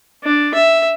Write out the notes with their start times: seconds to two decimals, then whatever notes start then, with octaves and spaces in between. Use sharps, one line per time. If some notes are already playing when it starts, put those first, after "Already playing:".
0.24 D4
0.54 E5